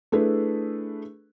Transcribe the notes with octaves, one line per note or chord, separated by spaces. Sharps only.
A3 D4 E4 G#4 A4 B4